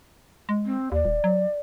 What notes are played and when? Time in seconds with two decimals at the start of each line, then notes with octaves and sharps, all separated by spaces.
0.49 G#3
0.65 C4
0.92 D#2 D5
1.05 D#1
1.24 F#3